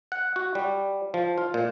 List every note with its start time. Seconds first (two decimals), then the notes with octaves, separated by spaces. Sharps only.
0.12 F#5
0.36 F#4
0.55 G3
1.14 F3
1.38 F4
1.54 A#2